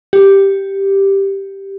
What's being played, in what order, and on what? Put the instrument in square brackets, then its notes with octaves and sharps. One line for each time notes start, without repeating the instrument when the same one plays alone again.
[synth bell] G4